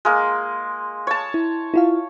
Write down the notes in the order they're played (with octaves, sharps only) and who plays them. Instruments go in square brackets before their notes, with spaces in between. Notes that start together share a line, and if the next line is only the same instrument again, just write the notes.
[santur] G#3 A#3
C#5 A5
[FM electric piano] E4
E4 F4 F5